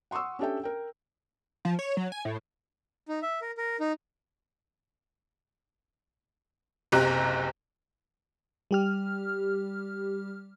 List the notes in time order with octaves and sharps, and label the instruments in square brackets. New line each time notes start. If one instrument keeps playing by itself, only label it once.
[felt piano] F#5 C6 C#6 D#6 E6
C#4 D4 G4 A4 E5 G5
A#4 G5
[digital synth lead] F3
C#5
F#3
G#5
A2
[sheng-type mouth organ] D#4
E5
A#4
A#4
D#4
[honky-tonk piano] F#1 B1 C3 G4 A#5 F#6
[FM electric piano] G3 G4 F6